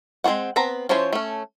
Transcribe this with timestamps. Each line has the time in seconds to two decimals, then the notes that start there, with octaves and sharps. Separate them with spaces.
0.24 G#3 C4 F4 F#4 F#5
0.56 B3 C4 B4 A#5
0.89 F3 C#4 E4 C5 C#5
1.13 A3 C#4